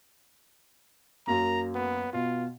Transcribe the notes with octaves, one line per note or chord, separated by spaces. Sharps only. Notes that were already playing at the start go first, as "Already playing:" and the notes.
F#2 A#3 A#5
B3
B2 F4